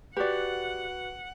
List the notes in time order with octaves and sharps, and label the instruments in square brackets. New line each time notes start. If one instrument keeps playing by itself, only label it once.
[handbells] F#4 B4 [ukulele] G4 D5 [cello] F#5